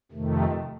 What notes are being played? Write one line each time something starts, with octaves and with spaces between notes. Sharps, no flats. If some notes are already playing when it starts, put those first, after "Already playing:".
F2 C3 D#3 A3